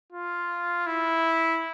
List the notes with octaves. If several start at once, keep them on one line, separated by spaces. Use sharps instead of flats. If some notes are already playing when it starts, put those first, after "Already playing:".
F4
E4